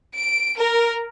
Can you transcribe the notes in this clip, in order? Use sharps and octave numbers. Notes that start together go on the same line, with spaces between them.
D7
A#4